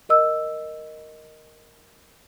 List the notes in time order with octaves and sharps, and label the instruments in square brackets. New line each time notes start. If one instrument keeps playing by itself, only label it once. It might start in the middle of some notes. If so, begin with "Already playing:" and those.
[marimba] A#4 D#5 E6